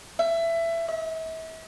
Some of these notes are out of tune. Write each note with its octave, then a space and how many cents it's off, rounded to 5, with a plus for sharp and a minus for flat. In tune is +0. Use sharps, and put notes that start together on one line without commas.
E5 +20
E5 -40